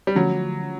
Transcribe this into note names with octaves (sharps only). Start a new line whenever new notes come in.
G3
D3 F3 F#3 A3 C#4 F4